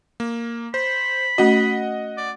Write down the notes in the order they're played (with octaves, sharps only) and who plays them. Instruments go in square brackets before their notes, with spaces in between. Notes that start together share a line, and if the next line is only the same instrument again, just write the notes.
[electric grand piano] A#3
[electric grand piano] C5 [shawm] B5
[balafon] A3 C#4 F#4 [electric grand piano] D#5 F#5
[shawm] D5